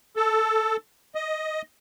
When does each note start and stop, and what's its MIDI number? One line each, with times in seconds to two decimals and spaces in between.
0.16 0.76 69
1.15 1.62 75